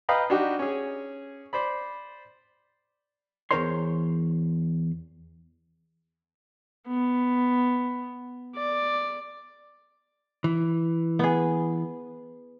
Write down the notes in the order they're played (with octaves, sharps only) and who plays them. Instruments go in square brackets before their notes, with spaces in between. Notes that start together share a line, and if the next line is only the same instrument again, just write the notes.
[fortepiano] B4 D#5 F5 G5 A#5 B5
D4 D#4 F#4 G4
C#4 G#4
C5 D5 B5
[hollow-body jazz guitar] E2 A#3 A#4 C5 C#5 C6
[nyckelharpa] B3
D5
[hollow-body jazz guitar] E3
[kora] B3 G#4